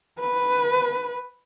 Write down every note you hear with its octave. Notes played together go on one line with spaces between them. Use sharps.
B4